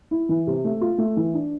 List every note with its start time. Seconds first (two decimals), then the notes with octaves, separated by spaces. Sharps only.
0.11 E4
0.29 E3
0.47 C3
0.65 A3
0.81 F4
0.98 A3
1.17 E3
1.34 D4